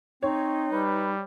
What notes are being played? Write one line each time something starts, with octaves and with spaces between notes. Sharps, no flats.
C4 D#4 C#5
G3 B4